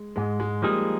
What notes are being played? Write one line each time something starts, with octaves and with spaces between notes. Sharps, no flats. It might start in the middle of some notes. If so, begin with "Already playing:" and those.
Already playing: G#3
G#2 G#3
G#3
F3 G3 A#3 D#4 G#4